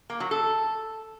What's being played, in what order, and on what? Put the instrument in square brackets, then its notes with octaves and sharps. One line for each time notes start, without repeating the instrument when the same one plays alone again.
[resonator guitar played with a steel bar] A#3
F#3
A4